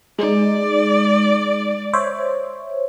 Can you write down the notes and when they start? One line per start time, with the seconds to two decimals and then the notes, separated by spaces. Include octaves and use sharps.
0.19 G#3 D#4 D5
1.93 C5 C#5 E5